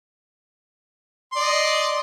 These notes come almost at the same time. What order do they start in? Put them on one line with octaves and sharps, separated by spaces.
C6 D5 D#5